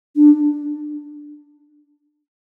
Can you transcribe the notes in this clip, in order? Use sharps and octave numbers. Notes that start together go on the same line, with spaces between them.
D4